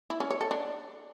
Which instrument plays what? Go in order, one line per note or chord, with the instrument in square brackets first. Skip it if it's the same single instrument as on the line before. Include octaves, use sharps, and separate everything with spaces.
[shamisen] E4
C#4
C#5
A4
D4